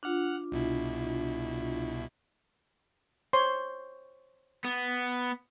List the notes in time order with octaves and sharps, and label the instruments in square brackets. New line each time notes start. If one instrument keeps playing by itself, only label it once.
[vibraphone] D4 F4 [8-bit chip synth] F#5 F6 F#6
[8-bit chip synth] C2 B2 E4
[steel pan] C5 C#5 C6
[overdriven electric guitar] B3